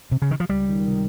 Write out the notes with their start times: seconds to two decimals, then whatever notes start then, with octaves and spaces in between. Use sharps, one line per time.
0.11 C3
0.22 C#3
0.31 D#3
0.40 F3
0.49 C#2 G3
0.67 D#3
0.84 C3